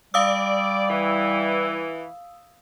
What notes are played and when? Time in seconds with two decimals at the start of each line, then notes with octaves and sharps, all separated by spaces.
0.14 G3 D5 F5 D#6 E6
0.89 E3